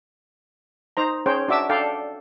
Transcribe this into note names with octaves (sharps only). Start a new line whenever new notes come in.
D#4 C5 A#5
C#4 G#4 C5 C#5 G5
D4 F#4 E5 D6 E6
D4 A4 D5 F5 G5